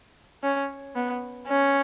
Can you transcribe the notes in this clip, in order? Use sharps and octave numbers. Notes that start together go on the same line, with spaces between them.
C#4
B3
C#4